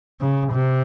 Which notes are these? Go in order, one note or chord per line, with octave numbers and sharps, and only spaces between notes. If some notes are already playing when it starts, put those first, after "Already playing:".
C#3
C3